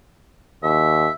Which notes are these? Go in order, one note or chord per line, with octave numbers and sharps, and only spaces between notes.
D#2 E5